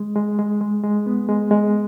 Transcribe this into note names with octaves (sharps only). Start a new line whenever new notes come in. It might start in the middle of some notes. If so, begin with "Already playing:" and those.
Already playing: G#3
G#3
G#3
G#3
G#3
B3
G#3
G#3